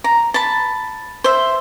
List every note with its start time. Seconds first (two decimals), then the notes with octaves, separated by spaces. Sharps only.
0.04 A#5
0.34 A5 B5
1.24 C5 E5